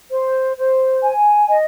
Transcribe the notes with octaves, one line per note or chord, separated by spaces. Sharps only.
C5
C5
G#5
D#5